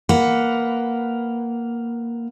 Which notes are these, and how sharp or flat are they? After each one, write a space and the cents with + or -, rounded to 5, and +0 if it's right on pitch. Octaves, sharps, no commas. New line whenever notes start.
A#3 +0 B4 +0 F#5 +0